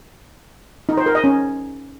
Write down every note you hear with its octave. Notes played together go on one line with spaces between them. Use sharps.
D#4
C5
A#4
D#5
C#4